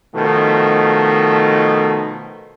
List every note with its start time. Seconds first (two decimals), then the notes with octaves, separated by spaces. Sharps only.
0.15 B2 D#3 F3 A3